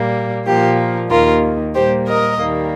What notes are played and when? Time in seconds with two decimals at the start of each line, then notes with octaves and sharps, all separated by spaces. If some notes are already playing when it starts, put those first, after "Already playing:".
Already playing: A#2 G3 A#3
0.46 A#2 F3 A#3 G4
1.10 D#2 D#3 A#3 F4 A#4
1.74 A#2 G3 A#3 G4 C5
2.07 A#4 D#5
2.39 D#2 D#3 G3 A#3